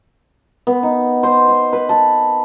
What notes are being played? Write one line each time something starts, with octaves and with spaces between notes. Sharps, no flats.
B3
D#4
C5
C6
B4
A5